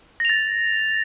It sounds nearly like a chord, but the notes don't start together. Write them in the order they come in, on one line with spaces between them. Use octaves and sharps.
A#6 F7 A6